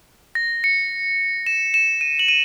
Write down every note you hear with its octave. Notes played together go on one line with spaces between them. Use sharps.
A#6
C#7
E7
E7
D#7
F#7
D#7